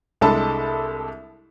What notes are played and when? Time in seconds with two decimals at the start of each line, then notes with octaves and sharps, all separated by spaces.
0.21 C2 G#3 D4 A4 A5 B5